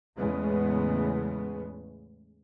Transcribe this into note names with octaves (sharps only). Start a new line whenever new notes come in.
E2 A2 C#3 G#3 B3